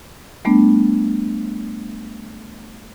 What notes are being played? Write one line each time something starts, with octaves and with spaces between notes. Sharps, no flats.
G3 A3 B3 D4